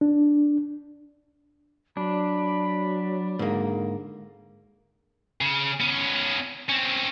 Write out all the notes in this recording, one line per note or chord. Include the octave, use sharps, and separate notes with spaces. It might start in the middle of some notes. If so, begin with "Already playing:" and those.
D4
F#3 D4 B5
G#2 D3 A#3
C#3
B3 C#4
C4 C#4